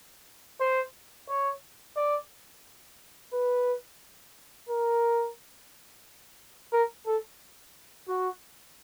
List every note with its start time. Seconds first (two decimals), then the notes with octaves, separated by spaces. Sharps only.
0.61 C5
1.29 C#5
1.97 D5
3.33 B4
4.69 A#4
6.73 A#4
7.06 A4
8.08 F#4